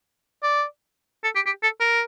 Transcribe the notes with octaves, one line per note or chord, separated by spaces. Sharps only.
D5
A4
G4
G4
A4
A#4